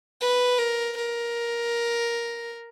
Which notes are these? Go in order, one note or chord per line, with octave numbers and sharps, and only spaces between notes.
B4
A#4
A#4